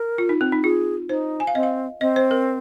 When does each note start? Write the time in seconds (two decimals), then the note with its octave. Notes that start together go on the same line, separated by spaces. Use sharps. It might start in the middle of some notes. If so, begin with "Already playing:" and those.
Already playing: A#4
0.18 F4
0.29 D#4
0.41 C4
0.52 D#4
0.63 F4 G#4
1.09 D#4 C5
1.40 G#5
1.47 F5
1.55 C4 D#5
1.63 F5
2.01 C4 D#5
2.16 C5
2.31 A#4